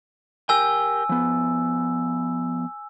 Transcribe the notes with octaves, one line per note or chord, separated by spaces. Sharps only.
G4 A#4 G5 G#5 E6
F3 B3